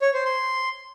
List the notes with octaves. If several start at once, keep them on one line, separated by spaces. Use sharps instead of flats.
C#5
C5
C6